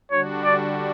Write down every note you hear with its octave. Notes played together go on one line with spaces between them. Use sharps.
D3 G3 D4 F#4 C#5
D5